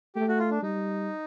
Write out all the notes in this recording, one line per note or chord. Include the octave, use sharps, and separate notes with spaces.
A3 G4
F#4
F4
D4
G3 D#4